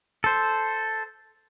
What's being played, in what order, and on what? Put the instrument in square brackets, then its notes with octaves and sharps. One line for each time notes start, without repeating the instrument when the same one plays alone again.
[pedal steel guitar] A4 C5